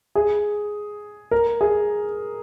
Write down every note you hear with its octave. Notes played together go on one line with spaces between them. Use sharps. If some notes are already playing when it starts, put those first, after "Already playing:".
G#4
A#4
G#4